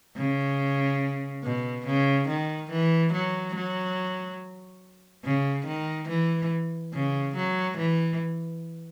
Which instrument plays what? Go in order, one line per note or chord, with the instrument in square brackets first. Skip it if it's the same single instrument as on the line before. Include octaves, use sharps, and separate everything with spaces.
[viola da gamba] C#3
B2
C#3
D#3
E3
F#3
F#3
C#3
D#3
E3
C#3
F#3
E3